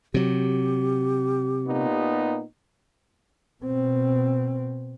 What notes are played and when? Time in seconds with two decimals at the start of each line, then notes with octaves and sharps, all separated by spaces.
0.14 C3 F#3 G4
1.67 A#2 B3 D#4
3.63 B2 C4